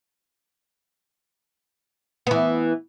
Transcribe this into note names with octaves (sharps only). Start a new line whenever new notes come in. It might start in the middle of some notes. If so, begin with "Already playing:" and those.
E3 B3